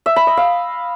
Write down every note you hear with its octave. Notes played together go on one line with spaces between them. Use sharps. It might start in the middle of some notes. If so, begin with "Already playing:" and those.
E5
B5
D#5
F5